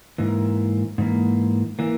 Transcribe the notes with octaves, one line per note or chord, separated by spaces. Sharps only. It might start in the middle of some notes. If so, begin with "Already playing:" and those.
G#2 E3 A#3
G#2 E3 A#3
E3 A#3